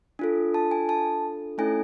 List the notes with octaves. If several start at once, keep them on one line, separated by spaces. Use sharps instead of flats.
D4 F4 A4
A5
G#5
A5
A3 C#4 E4 A4 G#5